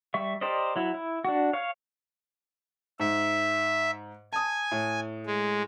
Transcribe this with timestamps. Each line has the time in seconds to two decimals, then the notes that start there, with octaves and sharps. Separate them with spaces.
0.14 G3 E5 C#6
0.41 G4 A#4 C5 D5 D#5
0.76 F#3 E4
0.94 E4
1.25 D4 F#4
1.53 C#5 F5
3.00 G#2 E5
4.32 G#5 A5 D#6
4.71 A2
5.26 G#3